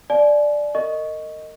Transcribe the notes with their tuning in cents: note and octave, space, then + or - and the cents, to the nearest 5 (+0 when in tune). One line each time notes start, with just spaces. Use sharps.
D5 +0 F5 -5 G#5 +45
A#4 -35 D#5 +0 C#6 +0